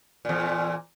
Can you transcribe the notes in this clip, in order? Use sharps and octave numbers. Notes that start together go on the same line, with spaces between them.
E2 A#2